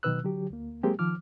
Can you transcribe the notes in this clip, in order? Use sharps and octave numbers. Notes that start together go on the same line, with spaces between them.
B2 D#3 F#3 B4 E6 F#6
D3 F#3 G4
D2 A#3
F#3 G#3 A#3 C4 G4 G#4
D#3 F3 D6 F6